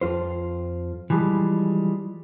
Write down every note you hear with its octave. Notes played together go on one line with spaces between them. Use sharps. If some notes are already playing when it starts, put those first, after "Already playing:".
F2 F4 C5
E3 F3 G3 G#3